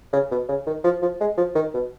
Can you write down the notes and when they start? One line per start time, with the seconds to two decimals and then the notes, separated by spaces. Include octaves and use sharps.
0.13 C#3
0.31 B2
0.48 C#3
0.67 D#3
0.84 F3
1.02 F3
1.21 G#3
1.38 F3
1.55 D#3
1.74 B2